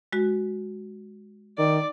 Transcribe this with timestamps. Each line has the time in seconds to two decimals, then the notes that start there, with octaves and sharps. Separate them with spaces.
0.13 G#3 F#4
1.58 D#3 D5